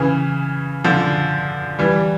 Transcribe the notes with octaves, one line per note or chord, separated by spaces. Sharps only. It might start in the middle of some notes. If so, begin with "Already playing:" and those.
Already playing: C#3 E3
D3 F3
E3 G3